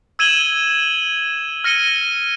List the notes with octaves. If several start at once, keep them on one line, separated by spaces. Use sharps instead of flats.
E6 G#6 D#7 E7 F#7 G7
F6 A#6 C#7 D#7 G7